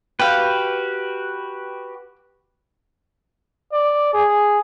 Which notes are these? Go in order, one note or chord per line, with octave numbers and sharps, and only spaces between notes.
F#4 G4 B4 F5 G5
D5
G#4